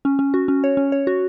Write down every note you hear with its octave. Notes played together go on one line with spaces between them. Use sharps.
C#4
C#4
F#4
C#4
C#5
C#4
C#5
F#4